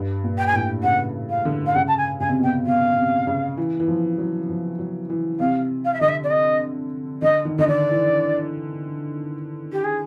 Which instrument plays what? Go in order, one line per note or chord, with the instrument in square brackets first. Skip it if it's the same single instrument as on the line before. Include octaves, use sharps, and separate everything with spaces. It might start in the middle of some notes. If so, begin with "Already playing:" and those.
Already playing: [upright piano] G2
A#2
[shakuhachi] G5
G#5
[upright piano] A2 [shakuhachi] G5
[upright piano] C#3 [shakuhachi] F#5
[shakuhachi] F5
[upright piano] D3
[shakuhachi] F5
[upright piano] C#3 [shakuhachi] F#5
[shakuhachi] A5
G#5
[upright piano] C#3 [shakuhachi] G#5
[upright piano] C3
B2
[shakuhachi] G5
[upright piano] C3
[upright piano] B2 [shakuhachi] F5
[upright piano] C3
C#3
E3
E3
F3
F#3
F3
F#3
E3
[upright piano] C3 [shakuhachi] F5
[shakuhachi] F5
E5
[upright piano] D3 [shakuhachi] D#5
[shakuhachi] E5
D5
D#5
[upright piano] D3 [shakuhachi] D#5
[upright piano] D#3
[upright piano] D3 [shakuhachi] D#5
[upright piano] D#3 [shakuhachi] D5
[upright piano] E3
[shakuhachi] G4
G#4